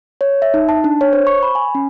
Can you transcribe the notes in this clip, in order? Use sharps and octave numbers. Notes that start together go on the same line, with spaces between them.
C#5
E5
D#4
A5
D4
C#5
C5
C#6
B5
G#5
C#4